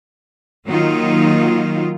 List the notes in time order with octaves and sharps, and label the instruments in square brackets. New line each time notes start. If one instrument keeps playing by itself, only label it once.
[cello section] D#3 F#3 A#3 D#4 F4